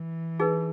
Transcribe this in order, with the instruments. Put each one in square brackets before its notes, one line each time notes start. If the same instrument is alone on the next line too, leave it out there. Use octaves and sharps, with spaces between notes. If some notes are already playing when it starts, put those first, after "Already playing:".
Already playing: [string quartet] E3
[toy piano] D#4 G#4 B4